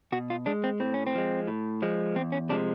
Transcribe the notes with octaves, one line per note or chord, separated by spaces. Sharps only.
B2 F#4
F4
G#3 D4
C4
A2 C4
C#4
C4
F3 G#3
A2
F3 G#3
E2 C4
C#4
C3 F3 G#3 D4